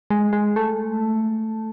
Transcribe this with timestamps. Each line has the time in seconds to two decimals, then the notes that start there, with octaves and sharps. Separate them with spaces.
0.10 G#3
0.33 G#3
0.56 A3